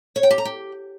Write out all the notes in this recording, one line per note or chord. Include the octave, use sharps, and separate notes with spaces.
C#5
G5
G4
A#5
G4